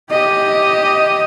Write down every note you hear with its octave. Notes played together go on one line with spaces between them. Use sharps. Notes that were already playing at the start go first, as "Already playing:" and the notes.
G4 D#5